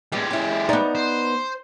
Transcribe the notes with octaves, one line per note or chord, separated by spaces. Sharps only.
A2 G3 G#3 B3 G4
C#4 E4
B3 D#4 D5 A#5
C5